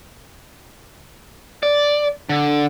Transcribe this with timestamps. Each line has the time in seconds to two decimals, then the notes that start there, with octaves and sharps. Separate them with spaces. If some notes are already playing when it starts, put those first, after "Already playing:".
1.63 D5
2.29 D3